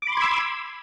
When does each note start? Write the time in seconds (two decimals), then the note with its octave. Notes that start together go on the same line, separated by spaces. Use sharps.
0.02 D6
0.07 B5
0.12 C6
0.17 G#6
0.22 E6